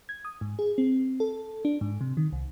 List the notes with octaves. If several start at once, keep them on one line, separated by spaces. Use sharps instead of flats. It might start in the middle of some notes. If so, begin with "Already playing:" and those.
G#6
D#6
G#2
G#4
C4
A4
D4
G#2
C3
D#3
C2